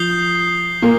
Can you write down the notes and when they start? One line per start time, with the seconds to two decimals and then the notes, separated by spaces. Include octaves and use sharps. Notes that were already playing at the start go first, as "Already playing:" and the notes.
Already playing: F3 D#6 G6 C7 G7
0.82 A#2 A#3